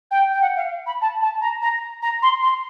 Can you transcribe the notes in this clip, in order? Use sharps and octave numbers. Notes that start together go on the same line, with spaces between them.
G5
G5
F#5
F5
B5
A5
A5
A#5
A#5
A#5
C6
C6